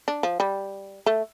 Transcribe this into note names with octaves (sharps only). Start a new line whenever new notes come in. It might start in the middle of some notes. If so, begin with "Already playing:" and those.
D4
F3
G3
A3